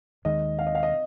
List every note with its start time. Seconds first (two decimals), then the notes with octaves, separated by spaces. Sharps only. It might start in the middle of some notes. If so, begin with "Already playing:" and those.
0.25 D#2 D#3 G#3 D#5
0.59 F5
0.67 D#5
0.75 F5
0.83 D#5